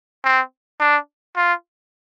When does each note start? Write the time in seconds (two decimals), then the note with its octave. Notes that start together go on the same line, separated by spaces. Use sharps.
0.24 C4
0.80 D4
1.37 F4